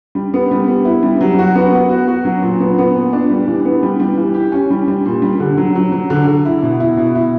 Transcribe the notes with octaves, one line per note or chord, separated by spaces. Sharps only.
G3
B3
G3
B3
E4
G3
F#3
F#4
B3
B3
F#4
F#4
F#3
A#2
B3
B3
A#2
D4
G3
E3
B3
G3
G3
E3
G4
C#4
G3
G3
A#2
G3
D3
F#3
F#3
F#3
D3
D3
E4
B2
E4
B2
E4